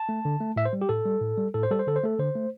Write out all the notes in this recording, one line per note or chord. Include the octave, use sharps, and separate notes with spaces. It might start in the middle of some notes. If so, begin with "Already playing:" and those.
Already playing: A5
A3
D3
A3
A2 E5
C5
G3
G4
A2 A4
G3
A2
G3
A2 A4
C5
G3 A4
C5
D3 A4
C5
A3 A4
D3 C5
A3